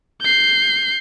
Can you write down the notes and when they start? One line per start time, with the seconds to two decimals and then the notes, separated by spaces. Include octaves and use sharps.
0.21 G6 C7